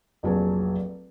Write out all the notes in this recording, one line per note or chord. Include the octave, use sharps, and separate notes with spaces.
F1 A#1 F#3 G#4 A5